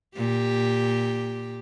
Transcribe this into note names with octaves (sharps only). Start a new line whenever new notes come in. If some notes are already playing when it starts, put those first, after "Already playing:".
A#2 G4